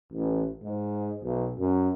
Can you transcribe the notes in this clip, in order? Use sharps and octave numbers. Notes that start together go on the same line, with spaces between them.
A1
G#2
B1
F#2